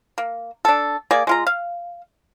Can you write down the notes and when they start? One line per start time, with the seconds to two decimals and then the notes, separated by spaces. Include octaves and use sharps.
0.18 A#3
0.65 D4 A4
1.11 A#3 G#4 D5
1.27 G#3 F4 A#5
1.47 F5